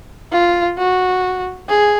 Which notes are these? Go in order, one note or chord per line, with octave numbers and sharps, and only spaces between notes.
F4
F#4
G#4